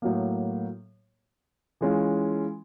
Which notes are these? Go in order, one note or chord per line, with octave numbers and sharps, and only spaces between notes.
A2 F#3 A#3
E3 G#3 C#4 F4